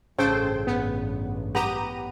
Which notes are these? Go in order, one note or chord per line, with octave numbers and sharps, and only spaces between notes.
A1 G2 C#3 A4 C5 G5
B3
B3 G4 B4 A#5 D#7